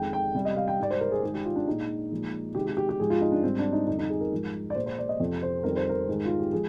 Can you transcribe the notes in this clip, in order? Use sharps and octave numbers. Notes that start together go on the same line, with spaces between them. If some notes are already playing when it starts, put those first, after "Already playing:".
Already playing: F2 D#3 G#3 G5
G5
C3 G3
D#5
F5
G5
G#2 G3 D5
C5
A#4
G#4
G#2 D#3 G#3 G#4
G4
F4
D4
A#2 G#3 D#4
A#2 F3 G#3
C3 D#3 G#3 G4
G4
G4
G4
G#2 F3 G#3 G#4
F4
D#4
D4
G#2 G3 C4
D4
D#4
F2 D3 G3 D#4
D#4
G#4
A#4
G#2 F3 G#3
D5
A#2 G#3 C5
C5
D5
D#5
F2 C3 F3
C5
F2 D#3 G3 A#4
C5
A#4
G#2 D#3 G#3
F4
G4
F3 G#3 G#4